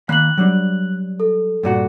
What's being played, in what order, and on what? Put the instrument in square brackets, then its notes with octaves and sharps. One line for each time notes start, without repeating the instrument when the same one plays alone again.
[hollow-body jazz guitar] D#3 A#3 B5 [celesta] F#6 F#7
[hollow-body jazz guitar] F#3 G3 D4
[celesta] A4
[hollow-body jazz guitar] G2 A#2 F#4